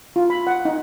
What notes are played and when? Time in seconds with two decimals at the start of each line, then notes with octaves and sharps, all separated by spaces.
0.16 F4
0.30 B5
0.47 F#5
0.65 D#4